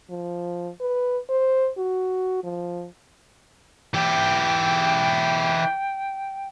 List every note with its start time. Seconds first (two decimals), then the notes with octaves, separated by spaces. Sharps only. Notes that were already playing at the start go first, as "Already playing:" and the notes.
0.10 F3
0.81 B4
1.30 C5
1.78 F#4
2.44 F3
3.94 E3 G4 G5